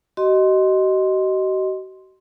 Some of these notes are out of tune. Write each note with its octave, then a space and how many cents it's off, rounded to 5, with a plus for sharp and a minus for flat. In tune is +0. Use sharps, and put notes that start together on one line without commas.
F#4 +45 D#5 +0 C6 +0